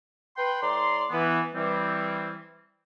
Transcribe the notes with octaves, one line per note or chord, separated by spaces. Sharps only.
B4 G5 B5 C6
A2 D5 A#5 C6
E3 B3
E3 G3 C4